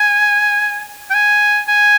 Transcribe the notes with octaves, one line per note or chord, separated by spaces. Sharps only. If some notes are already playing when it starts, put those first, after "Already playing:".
Already playing: G#5
G5
G#5
G#5